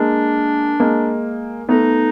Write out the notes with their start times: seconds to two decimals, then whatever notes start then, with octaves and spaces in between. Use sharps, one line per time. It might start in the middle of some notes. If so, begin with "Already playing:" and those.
Already playing: G#3 A#3 D4
0.80 G#3 A#3
1.69 A3 B3 D#4